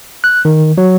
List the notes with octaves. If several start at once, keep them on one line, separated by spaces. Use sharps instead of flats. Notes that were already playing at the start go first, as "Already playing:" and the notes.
F#6
D#3
F#3